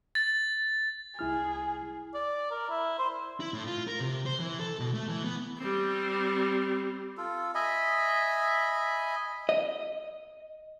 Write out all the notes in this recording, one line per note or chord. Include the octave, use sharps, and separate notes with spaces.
A6
C2 E4 G#4 F6
D5
A#4
E4
C5
E4
A2
F4
A#4
C3
C5
E3
A4
B2
A3
E3
B3
G3 C4
F4 A4
D#5 E5 G#5 B5
D#5